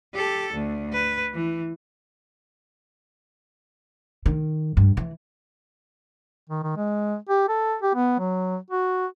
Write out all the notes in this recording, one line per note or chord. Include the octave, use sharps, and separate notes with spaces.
G4 A4
D2
B4
E3
D#3
G2
E3
D#3
D#3
G#3
G4
A4
G4
B3
F#3
F#4